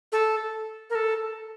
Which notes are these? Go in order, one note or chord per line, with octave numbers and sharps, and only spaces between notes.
A4
A#4
A4